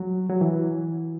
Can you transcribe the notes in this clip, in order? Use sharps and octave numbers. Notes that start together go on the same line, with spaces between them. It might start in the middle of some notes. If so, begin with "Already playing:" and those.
Already playing: F#3
F#3
E3